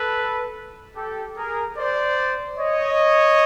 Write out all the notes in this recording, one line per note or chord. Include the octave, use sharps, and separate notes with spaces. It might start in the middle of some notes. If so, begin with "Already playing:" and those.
Already playing: A4 B4
G4 A4
G#4 A#4
C5 D5
C#5 D#5